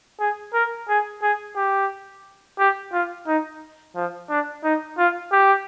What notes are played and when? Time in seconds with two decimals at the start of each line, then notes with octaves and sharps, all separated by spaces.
0.20 G#4
0.53 A#4
0.88 G#4
1.22 G#4
1.56 G4
2.59 G4
2.93 F4
3.27 D#4
3.96 F3
4.30 D4
4.64 D#4
4.98 F4
5.32 G4